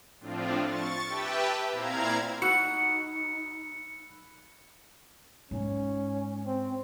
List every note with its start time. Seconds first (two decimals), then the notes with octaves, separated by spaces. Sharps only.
0.20 A2 F3 C4 D4 F4
0.64 C#6 A6
1.06 G4 B4 E5 G5 A5
1.72 A#2 C4 E4 F5 A#5 G#6
2.42 D#4 F#4 B5 E6 F#6 C#7
5.51 G#2 G#3 C#4
6.46 C4